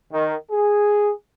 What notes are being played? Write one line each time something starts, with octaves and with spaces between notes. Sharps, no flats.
D#3
G#4